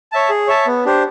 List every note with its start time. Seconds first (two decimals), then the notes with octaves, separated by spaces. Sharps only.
0.12 C#5 E5 A5
0.30 G#4
0.47 C#5 E5 A5
0.66 B3
0.85 D4 G4 C5